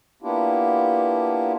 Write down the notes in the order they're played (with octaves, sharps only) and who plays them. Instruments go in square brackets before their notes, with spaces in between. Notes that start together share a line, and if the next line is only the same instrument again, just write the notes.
[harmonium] A#3 B3 D4 E4 F4 G4